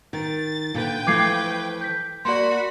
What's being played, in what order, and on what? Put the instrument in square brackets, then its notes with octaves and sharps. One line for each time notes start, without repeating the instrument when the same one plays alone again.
[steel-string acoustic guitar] D#3 [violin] A6
[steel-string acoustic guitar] A#2 D3 [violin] B4 G5
[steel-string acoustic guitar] E3 F3 A3 [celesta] D6 G#6 C7
[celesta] G6 B6
[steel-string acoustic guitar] A#3 [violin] F#4 B5 [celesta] D5 C6